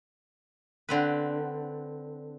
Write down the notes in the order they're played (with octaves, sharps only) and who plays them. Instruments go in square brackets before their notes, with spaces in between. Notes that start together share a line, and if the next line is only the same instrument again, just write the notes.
[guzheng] D3 C4 B4